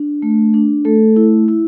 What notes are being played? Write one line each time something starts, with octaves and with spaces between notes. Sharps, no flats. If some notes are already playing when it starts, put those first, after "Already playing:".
Already playing: D4
A3
D4
A3 A4
E4
E4